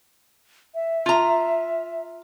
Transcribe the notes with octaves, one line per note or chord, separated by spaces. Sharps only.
E5
F4 A#5